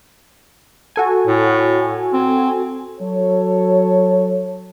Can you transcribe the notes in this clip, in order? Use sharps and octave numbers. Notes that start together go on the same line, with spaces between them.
F#4 A4 G#5
A2
C4
F#3 A4 C#5